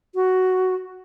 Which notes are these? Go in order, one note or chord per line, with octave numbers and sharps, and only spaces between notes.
F#4